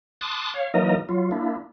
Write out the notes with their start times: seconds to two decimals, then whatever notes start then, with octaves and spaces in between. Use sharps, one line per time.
0.21 A5 C6 D6 D#6 F#6
0.54 C#5 F5
0.74 E3 F#3 A#3 D#4 A#4 D#5
1.09 F#3 F4
1.31 A#3 D4 E4